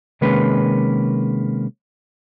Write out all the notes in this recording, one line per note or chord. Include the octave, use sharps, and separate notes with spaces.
C3 D#3 G#3 A#3 C#4 B4